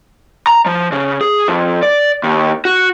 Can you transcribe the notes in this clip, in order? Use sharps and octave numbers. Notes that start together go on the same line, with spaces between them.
A#5
F3
C#3
G#4
F2
D5
D#2
F#4